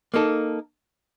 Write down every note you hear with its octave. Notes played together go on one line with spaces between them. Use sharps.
A#3 D#4 A4